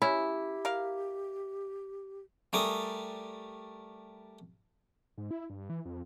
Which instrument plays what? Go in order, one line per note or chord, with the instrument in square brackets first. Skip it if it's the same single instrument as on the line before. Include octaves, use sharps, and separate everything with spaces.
[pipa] C#4 [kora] E4 [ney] G4
[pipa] A#4 F5
[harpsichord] G3 A3 A#4 G#5 D6 D#6
[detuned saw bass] G#2
E4
G2
E3
F2